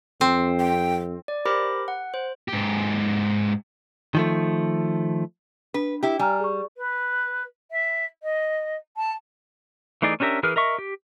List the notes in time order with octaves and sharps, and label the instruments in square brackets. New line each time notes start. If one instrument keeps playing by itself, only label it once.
[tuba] F2 [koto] C4
[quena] G5
[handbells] D5
G4 A#4 C5 B5 D6 A#6
F#5
C5
[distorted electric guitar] G#2 G4
[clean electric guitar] D#3 F3 A3
[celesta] D4 [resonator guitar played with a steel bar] B4
[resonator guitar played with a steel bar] E4 G4
[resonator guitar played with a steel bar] G3 [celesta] G#5 A#5 F6
[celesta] G#4 C#6
[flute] B4
E5
D#5
A5
[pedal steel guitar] E3 A3 D#4 G#4 D5
C#4 D4 G4 A#4 E5
E3 G#4 A#4 B4 F6
A#4 D#5 E5 C#6
G4